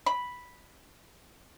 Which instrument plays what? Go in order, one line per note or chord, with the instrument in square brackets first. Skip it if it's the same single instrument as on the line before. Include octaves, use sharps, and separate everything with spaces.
[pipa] B5